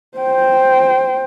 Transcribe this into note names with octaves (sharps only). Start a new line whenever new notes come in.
C5 G5